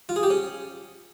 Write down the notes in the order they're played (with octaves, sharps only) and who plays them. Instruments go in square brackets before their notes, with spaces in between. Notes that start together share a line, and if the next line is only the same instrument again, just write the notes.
[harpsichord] F4
G#4
G4
C#4